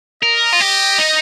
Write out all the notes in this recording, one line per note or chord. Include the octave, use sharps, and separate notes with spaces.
A#4 D#5
F4
G4
D#4